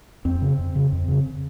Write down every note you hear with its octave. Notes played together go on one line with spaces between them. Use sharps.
F2 C4
C#3
F2
C#3
F2
C#3